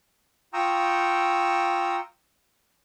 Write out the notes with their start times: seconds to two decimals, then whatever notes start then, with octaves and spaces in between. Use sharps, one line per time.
0.54 F4 G5 A#5 C#6 D#6 E6